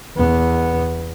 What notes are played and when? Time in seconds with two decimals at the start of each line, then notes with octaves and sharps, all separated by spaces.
0.16 E2 B3